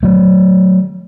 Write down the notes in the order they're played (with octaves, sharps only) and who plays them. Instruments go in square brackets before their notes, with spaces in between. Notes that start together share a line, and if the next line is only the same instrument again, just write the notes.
[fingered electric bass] F#3 A3